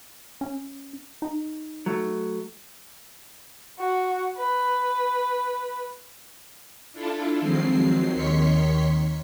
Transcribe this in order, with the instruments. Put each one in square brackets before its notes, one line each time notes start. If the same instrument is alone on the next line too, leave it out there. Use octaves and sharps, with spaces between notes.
[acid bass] C#4
D#4
[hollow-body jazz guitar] F#3 A3
[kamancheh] F#4
B4
[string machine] D4 E4 F4 A4
D#3 F3 F#3 G#3 C4 C7
D#2 D#3 C#5 C6 B6 C#7